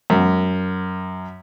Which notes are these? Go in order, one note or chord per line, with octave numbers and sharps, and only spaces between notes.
F#2